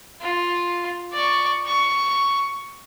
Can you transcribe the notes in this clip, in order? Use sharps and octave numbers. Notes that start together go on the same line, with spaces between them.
F4
D5 C#6
C#6